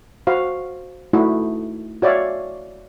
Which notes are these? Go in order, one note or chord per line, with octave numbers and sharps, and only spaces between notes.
F#4 C5 F5
A3 D#4 E4 F#4
F#4 C#5 D5 E5 F5